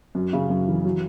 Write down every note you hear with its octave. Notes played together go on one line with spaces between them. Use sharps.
F#2
C#3
F#2
E3
F#3